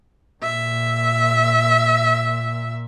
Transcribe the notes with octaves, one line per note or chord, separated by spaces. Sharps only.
A#2 E5